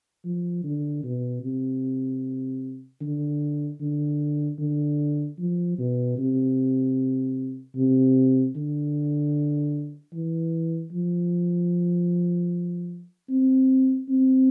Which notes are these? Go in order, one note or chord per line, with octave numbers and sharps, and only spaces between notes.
F3
D3
B2
C3
D3
D3
D3
F3
B2
C3
C3
D3
E3
F3
C4
C4